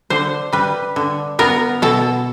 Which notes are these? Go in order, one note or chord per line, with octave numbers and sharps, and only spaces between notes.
D3 C5
G3 B4
D3
B3 A#4
B2 A4